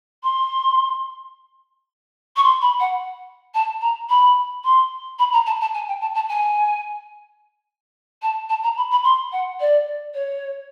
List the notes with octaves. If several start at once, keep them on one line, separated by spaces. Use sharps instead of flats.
C6
C#6
C6
B5
F#5
A5
A#5
B5
C6
B5
A#5
A5
A5
G#5
G5
A5
A5
G#5
A5
A5
A#5
B5
B5
C6
F#5
D5
C#5